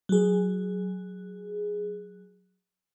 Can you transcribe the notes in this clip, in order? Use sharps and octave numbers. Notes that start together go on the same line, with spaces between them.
F#3 G#4